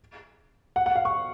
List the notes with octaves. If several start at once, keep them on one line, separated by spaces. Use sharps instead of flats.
F#5
F#5
F5
C#6